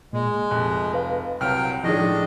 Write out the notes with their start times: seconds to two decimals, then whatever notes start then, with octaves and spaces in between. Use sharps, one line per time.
0.13 A#2 G#3
0.51 F1 F#6
0.94 B4 F5
1.41 C2 F#3 G5 F6
1.84 A2 D#3 F3 G#3 D4 D#4 D#5